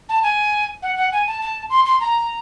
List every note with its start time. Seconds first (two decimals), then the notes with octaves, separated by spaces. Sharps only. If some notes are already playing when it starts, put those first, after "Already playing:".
0.09 A5
0.23 G#5
0.83 F#5
0.96 F#5
1.12 G#5
1.27 A5
1.41 A5
1.70 C6
1.86 C6
2.00 A#5